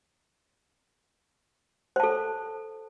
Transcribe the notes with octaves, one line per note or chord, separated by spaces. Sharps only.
A4 C5 A5